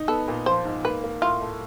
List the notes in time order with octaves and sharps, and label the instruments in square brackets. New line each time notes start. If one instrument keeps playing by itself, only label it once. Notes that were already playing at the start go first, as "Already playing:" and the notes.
Already playing: [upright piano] D#4
[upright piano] B3 [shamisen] A4
[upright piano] A#2
[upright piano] F3 [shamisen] C5
[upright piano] G#2
[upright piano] A#3 [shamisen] B4
[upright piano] A#3
[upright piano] A2 [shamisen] F4
[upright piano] A3